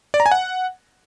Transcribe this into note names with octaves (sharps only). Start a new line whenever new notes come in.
D5
A#5
G#5
F#5